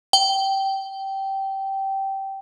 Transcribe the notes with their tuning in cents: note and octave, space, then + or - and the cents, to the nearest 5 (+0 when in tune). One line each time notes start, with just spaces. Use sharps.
G5 -15